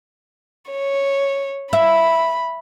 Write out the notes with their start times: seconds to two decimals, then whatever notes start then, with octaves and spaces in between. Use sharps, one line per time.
0.71 C#5
1.73 E5 B5